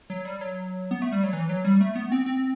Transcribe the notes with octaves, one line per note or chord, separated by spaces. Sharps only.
F#3
G3
F#3
B3
A3
G3
F#3
E3
F#3
G3
A3
B3
C4
C4